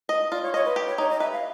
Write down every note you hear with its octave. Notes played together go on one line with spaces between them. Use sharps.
D#5
F4 D5
C#5
C#5 D#5
B4
G4
C#5
D#4 C#5
D#5
B4 E5
F5